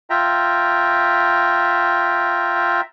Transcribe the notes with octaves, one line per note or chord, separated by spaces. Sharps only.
F4 E5 G5 A#5